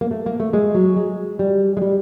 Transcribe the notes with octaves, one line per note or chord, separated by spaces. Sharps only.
A#3
A3
A#3
A3
G#3
F#3
G#3
G3
G#3
G3